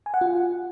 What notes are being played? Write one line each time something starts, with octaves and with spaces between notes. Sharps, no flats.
G#5
F#5
F4